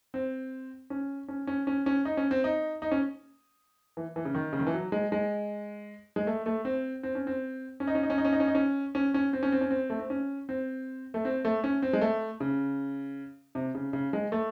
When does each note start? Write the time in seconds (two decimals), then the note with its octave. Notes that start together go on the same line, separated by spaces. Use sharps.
0.14 C4
0.90 C#4
1.28 C#4
1.47 C#4
1.67 C#4
1.86 C#4
2.05 D#4
2.17 C#4
2.31 C4
2.44 D#4
2.82 D#4
2.92 C#4
3.97 E3
4.16 E3
4.25 C#3
4.35 D#3
4.53 C#3
4.59 D#3
4.67 E3
4.74 F#3
4.92 G#3
5.12 G#3
6.16 G#3
6.27 A3
6.46 A3
6.65 C4
7.03 C4
7.15 C#4
7.27 C4
7.80 C#4
7.87 D#4
7.95 C#4
8.03 D#4
8.10 C#4
8.18 D#4
8.25 C#4
8.33 D#4
8.40 C#4
8.47 D#4
8.55 C#4
8.95 C#4
9.14 C#4
9.33 C4
9.43 C#4
9.52 C4
9.61 C#4
9.71 C4
9.90 A3
9.99 C4
10.10 C#4
10.49 C4
11.14 A3
11.25 C4
11.45 A3
11.64 C#4
11.82 C4
11.93 G#3
12.01 A3
12.40 C#3
13.55 C3
13.75 C#3
13.93 C#3
14.13 G#3
14.32 A3